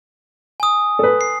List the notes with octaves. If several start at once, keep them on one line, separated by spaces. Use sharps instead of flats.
G#5 D#6
A4 B4
C7